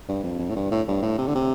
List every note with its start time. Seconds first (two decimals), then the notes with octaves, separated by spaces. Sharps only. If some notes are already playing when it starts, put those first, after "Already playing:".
0.08 G2
0.24 F2
0.39 F2
0.49 A2
0.55 G2
0.71 A2
0.88 G2
1.02 A2
1.18 C3
1.27 D3
1.35 C3